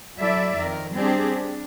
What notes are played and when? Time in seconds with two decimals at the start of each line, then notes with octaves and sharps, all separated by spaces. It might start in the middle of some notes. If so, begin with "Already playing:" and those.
0.18 F#3 E4 A4 D5 E5
0.57 F2 D#3 A#4
0.94 G3 C4 D4 G4 G#4
1.33 D4